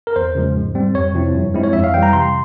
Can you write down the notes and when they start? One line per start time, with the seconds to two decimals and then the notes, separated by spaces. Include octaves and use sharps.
0.07 A#4
0.16 E2 C5
0.35 C#3 F3 G#3
0.55 G#2
0.75 G3 C4
0.94 F2 C#5
1.14 C3 F3 C4 E4
1.34 G2
1.54 F3 G#3 C4 E4
1.64 C#5
1.73 F2 E5
1.84 F5
1.94 E3 G5
1.97 G3
2.03 A#5
2.13 C3 C6